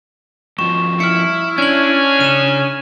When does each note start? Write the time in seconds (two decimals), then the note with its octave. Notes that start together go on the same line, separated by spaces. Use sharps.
0.59 G2 F3 C#6 E7
1.00 E4 F6 C#7
1.58 C#4 D4 G#6 F#7
2.21 C#3 D#7 E7